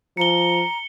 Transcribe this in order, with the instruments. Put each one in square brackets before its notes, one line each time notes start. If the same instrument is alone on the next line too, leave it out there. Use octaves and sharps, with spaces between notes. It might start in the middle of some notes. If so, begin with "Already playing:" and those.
[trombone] F3 [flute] A#5 [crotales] C#7 G7